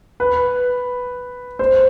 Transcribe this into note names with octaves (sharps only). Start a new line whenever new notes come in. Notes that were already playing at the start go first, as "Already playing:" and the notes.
B4
C5